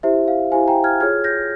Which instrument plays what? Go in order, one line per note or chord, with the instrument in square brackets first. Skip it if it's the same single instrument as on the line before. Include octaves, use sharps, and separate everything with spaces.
[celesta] E4 G4 C5 E5
F5
E4 G4 C5 F5 G#5
G5 A#5
F6 G#6
F4 G#4 C#5 F6 G#6
G6 A#6